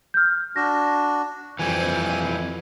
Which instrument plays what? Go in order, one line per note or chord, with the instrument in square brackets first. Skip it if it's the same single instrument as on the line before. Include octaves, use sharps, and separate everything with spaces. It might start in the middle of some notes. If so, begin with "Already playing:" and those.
[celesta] F6 G6
[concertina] D4 F#4 [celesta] A#6
[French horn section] F2 [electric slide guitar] E3 G3 C4 [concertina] G#5